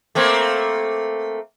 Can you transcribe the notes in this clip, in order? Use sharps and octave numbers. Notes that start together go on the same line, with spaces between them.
A3 A#3 C4